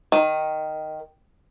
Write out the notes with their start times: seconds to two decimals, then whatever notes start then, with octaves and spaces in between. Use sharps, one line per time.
0.12 D#3